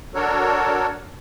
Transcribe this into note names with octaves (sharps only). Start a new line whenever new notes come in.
D4 F#4 A4 A#4 C#5